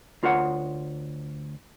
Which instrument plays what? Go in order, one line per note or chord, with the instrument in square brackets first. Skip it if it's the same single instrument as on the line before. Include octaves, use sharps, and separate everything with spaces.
[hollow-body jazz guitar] D2 F4 A#4 C#5 F#5